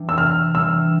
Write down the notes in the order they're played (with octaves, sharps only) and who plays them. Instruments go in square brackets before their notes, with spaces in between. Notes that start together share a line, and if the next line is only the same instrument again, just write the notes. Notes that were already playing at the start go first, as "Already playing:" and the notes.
Already playing: [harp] E3 G3 D4
[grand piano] E6
[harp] C3 [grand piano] F6
[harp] E3 G3 D4 [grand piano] E6